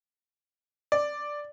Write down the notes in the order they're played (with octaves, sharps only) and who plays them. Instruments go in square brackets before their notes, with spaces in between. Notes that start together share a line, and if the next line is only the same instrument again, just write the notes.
[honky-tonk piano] D5